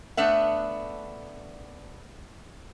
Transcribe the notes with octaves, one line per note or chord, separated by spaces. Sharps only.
A3 B3 D4 E5 F#5